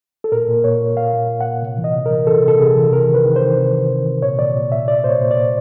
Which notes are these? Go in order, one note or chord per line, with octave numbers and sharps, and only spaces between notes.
A4
A#2 A#4
A#2
A#2 C#5
A#2
A#2 F5
A#2
A#2
F#5
A#2
C3
E3
D#5
C3
A#4
E3
E3 A4
C3 A4
C3 G#4
E3
C3 A#4
D#3
B4
D#3
C5
D#3
C3
D#3
C3
C3
A#2 C#5
A#2 D5
A#2
A#2 E5
A#2 D5
A#2 C5
C#5
A#2
D5
A#2